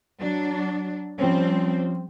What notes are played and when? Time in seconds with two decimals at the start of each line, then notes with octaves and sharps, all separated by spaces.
0.20 F#3 D4
1.19 F3 G3 C4 C#4